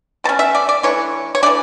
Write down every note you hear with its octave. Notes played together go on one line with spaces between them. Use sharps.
B2 A3 C#4 A5
E5
D5
D5
E3 A3 D4 C#5
C#5
E3 A3 D4 D5